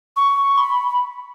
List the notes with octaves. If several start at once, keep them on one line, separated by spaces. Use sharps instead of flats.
C#6
C#6
B5